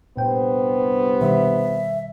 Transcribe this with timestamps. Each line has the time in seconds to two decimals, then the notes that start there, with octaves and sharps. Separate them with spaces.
0.17 C2 G2 A#2 B3 C5 G5
1.21 B2 D#3 G3 E5